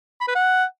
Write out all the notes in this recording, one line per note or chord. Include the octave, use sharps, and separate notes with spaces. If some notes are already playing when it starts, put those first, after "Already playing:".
B5
B4
F#5